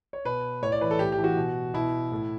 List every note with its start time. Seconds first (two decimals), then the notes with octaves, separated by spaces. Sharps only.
0.13 C#5
0.25 B2 B4
0.62 A2 C#5
0.72 D5
0.81 E3 B4
0.91 A4
0.99 A2 G4
1.12 G4
1.18 E3
1.24 F#4
1.37 B2
1.74 B2 E4
2.12 A2